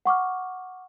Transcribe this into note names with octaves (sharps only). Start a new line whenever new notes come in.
F#5 C#6 D6 F6